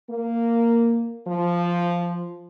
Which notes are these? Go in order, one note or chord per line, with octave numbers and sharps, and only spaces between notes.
A#3
F3